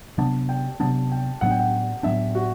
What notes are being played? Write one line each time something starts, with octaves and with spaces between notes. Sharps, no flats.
C3 F#3 B3 D4 A5
G5
C3 F#3 B3 D4 A5
G5
A2 F#3 B3 D4 F#5
G5
F#5
A2 F#3 B3 D4 E5
F#4